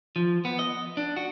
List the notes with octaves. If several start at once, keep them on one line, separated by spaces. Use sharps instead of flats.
F3
B3
D#5
D4
F#4